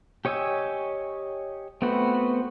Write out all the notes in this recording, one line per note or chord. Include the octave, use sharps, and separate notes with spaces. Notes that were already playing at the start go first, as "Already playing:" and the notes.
G4 C#5 D#5 G#5 E6
A3 B3 C4 F#4 B4